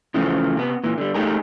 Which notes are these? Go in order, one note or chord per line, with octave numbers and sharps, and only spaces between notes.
C#3 E3 F3 A3 C4
C3 B3
A#2 E3
D3 G3
A3 D#4 G4 G#4 A#4